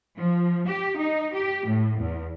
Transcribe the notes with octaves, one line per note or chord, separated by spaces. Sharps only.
F3
G4
D#4
G4
A2
E2